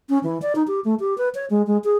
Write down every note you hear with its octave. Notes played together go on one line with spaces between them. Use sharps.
C#4
E3
D5
D#4
G4
A3
G4
B4
C#5
G#3
G#3
G#4